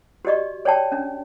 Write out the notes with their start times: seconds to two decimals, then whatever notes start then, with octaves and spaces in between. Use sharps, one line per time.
0.25 F#4 G4 D5 D#5 C#6
0.65 C#5 D5 G5 A5
0.92 C#4 D4